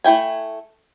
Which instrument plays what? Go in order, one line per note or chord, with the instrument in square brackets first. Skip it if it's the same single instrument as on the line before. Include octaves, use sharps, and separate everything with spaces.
[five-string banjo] A3 E4 G5 G#5